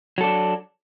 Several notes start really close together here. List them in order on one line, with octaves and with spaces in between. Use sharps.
F#3 A4 D4